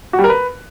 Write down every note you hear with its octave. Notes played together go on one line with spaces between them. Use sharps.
F#4
G3
A#4
B4